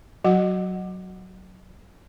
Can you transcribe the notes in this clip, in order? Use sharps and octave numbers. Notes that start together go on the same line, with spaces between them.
F#3 F#4 F#5